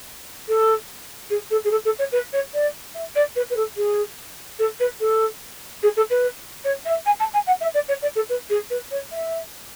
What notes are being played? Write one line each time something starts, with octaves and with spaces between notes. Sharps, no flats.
A4
G#4
A4
G#4
A4
A4
C#5
B4
C#5
D5
E5
D5
B4
B4
A4
G#4
A4
B4
A4
G#4
A4
B4
C#5
E5
G#5
A5
G#5
F#5
E5
D5
C#5
D5
A4
B4
G#4
B4
C#5
E5